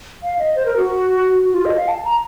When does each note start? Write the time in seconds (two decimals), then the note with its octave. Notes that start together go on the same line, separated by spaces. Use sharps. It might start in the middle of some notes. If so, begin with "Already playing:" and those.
0.23 F5
0.39 D#5
0.56 C5
0.66 A#4
0.77 F#4
1.44 F#4
1.54 F4
1.65 D#5
1.77 F5
1.88 A5
2.05 A#5